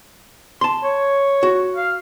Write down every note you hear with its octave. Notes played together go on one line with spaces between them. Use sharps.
A5 C6
C#5
F#4
F5